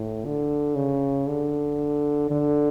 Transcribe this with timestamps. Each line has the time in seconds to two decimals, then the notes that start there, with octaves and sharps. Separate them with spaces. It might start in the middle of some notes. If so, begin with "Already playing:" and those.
Already playing: A2
0.25 D3
0.76 C#3
1.28 D3
2.31 D3